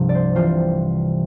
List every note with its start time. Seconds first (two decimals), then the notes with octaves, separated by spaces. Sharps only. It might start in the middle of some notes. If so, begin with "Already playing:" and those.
Already playing: C2 G2 C3 F3 C4 E4
0.09 D5
0.15 C5
0.35 C3 E3 G3 C4 F4 C5